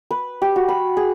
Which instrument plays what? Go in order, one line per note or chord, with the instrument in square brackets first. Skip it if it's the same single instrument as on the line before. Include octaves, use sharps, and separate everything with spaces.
[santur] B4
G4
F#4
B5
G#4